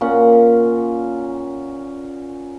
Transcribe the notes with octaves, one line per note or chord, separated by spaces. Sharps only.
A#2 C#4 F#5